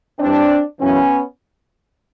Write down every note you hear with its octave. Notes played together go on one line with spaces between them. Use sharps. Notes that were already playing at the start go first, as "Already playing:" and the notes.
G2 E3 C4 D4
F#2 C#3 E3 B3 C#4